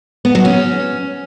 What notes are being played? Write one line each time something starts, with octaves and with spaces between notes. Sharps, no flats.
B3
F#3
C#4